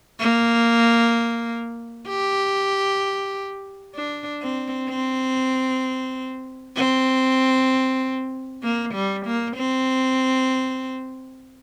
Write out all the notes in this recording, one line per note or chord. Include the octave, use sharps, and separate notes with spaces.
A#3
G4
D4
C4
C4
C4
A#3
G3
A#3
C4